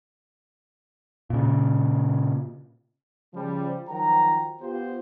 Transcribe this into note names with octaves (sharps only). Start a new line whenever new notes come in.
A#2 C#3
C#3 F3 G3
D#3 F3 F#3 F#5 G5 A#5
B3 F4 G4 C5